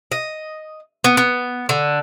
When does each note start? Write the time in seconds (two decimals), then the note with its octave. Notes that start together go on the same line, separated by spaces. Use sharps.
0.12 D#5
1.04 B3
1.17 B3
1.69 D3